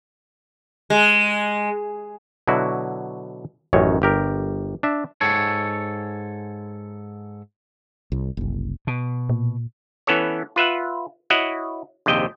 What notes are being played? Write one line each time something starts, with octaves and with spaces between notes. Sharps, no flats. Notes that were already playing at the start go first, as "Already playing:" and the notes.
G#3
B2 D3 F#3 E4 F#4
A1 F#2 D#3 C#5
G1 G4 A#4
D4 E5
G#2 A4 C#5
C2
F#1 C2
B2
A#2
E3 B3 C#4 A4 C#5
F4 B4 E5 F#5
E4 F#4 C#5 D#5 F#5
A#1 D#2 C3 D#5 G5